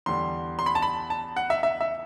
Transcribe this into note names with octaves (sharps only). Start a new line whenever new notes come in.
E2 D3 G3 C6
C6
B5
A5
B5
A5
F#5
E5
E5
E5